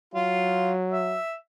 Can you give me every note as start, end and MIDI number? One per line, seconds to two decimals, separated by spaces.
0.14 1.17 54
0.14 0.72 65
0.92 1.35 76